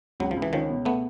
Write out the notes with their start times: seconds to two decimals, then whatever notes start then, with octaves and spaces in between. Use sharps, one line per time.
0.20 C#2 F#3
0.31 F3
0.36 C#2
0.42 E3
0.52 D#3 F3 C#4
0.69 B2
0.85 B2 A3 B3